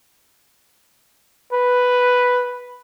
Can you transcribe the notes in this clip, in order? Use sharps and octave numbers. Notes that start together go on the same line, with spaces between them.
B4